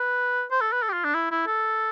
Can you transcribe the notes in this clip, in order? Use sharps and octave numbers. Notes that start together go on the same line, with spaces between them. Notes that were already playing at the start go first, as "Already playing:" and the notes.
Already playing: B4
C5
A4
B4
A4
G4
F4
D4
E4
E4
A4